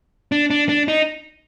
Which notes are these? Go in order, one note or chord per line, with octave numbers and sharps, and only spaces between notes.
D4
D4
D4
D#4